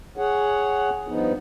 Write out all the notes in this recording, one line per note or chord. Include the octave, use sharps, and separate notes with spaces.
G#4 C#5 F#5
G2 F3 B3 D#4